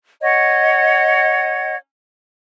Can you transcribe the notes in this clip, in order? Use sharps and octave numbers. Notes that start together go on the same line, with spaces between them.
C#5 D#5 F#5 G#6